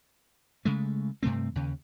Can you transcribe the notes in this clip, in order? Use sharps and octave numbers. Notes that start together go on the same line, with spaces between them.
C#3 G#3 A3
G2 C3 A3 C4
D#2 C#3